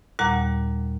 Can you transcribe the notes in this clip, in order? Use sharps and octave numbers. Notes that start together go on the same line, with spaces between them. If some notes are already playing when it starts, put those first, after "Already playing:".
D#2 A#2 G3 F#5 A#5